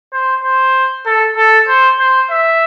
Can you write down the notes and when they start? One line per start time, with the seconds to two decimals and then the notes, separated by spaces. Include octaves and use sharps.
0.13 C5
0.44 C5
1.06 A4
1.37 A4
1.68 C5
1.99 C5
2.30 E5